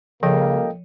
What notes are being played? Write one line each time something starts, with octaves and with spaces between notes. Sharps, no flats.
C#2 C#3 F3 G3 A#3 A4 D#5 G5